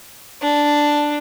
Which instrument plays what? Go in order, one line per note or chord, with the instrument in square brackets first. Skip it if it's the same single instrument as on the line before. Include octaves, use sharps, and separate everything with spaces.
[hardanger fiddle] D4